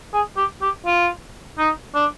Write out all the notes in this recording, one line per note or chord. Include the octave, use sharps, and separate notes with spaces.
G#4
G4
G4
F4
D#4
D4